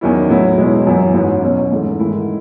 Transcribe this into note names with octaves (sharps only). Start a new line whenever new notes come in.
E2 D#3 F#3 C#4 E4
A2 F#3 B3 E4
B2 G#3 C#4 E4
F#2 E3 B3 E4
G#2 F#3 C#4 E4
E2 B2 F#3 C#4
G#2 E3 A3
G#2 D#3 A3 E4